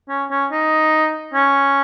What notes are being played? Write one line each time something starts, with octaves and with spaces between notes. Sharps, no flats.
C#4
C#4
D#4
C#4